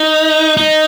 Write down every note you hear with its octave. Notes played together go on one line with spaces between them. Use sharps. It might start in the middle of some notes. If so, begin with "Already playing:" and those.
Already playing: D#4
D#4